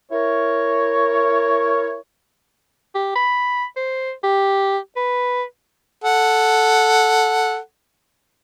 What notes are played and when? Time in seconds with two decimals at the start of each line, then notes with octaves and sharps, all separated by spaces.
0.11 E4 A#4 C#5
2.95 G4
3.15 B5
3.76 C5
4.24 G4
4.96 B4
6.04 A4 F#5